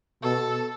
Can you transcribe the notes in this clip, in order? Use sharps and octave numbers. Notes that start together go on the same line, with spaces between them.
B2 A4